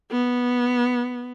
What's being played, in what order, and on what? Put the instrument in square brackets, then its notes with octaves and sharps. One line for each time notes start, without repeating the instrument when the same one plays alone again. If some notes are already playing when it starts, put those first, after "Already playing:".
[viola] B3